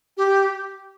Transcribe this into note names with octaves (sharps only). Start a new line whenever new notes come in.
G4